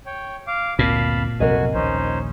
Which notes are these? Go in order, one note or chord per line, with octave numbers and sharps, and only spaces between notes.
C#5 G5
F5 D6
G1 D2 A#2 C4 F5 A5 B5
B1 F2 C3 F#4 A#4 D#5 G#5
A#1 D#2 C#4 D#4 C5